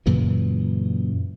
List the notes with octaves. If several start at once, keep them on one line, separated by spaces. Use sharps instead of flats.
F#2 A#2 C#3 E3